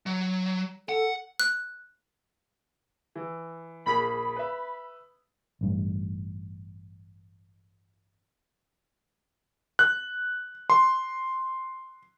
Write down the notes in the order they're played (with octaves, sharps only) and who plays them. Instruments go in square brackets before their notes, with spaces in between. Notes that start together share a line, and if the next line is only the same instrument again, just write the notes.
[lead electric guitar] F#3
[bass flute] A4 [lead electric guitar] F#5
[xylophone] F#6
[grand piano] E3
[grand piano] A#1 A#3 G#4 [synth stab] B5
[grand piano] B4 E5
[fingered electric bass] A1 G2
[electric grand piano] F#6
C6